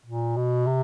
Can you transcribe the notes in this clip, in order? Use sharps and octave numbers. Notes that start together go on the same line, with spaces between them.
A#2
B2
C3